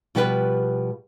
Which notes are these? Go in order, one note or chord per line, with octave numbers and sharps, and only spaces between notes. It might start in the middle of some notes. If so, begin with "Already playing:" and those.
B2 F3 G3 G4 G#4 B4